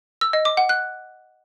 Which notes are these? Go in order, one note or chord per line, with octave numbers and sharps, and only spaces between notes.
E6
D#5
D6
F#5
F#6